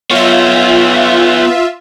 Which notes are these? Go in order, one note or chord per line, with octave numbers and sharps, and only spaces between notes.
B3 F4 C#5 E5